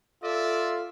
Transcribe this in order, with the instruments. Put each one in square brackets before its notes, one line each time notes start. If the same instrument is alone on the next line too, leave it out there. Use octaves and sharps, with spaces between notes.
[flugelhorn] F4 [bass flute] A4 [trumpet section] D5 E5